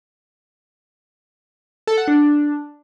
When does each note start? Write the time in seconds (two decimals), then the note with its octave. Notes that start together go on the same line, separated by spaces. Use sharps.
1.87 A4
1.98 F#5
2.08 D4